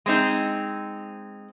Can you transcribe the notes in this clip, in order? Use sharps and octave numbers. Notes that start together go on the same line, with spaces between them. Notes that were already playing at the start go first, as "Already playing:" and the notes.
G#3 C4 D#4